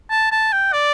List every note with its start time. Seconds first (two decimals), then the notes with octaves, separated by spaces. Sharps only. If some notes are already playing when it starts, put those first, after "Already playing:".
0.10 A5
0.31 A5
0.53 G5
0.73 D5